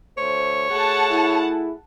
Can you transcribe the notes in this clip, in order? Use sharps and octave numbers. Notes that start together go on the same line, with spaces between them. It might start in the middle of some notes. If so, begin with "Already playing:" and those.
D2 A3 C5 C#5
A3 F#4 G#4 F#5 A5
E4